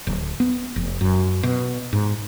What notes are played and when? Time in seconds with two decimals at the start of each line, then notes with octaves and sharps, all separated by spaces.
0.07 D1
0.40 B3
0.76 F1
1.01 F#2
1.43 B2
1.93 G#2